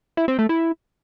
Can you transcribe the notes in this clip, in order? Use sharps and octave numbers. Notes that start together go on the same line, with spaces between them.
E4
C4
A3
E4